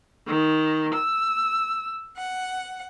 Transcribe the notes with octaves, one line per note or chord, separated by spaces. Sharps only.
D#3
E6
F#5